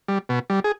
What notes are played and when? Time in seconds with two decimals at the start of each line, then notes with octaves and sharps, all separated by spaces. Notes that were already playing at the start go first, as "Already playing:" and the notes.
0.08 G3
0.29 B2
0.50 G3
0.64 G#4